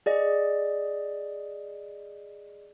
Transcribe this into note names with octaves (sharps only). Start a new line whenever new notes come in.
G#4 D5 D#5